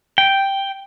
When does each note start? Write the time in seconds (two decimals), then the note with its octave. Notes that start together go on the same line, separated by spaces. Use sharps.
0.18 G5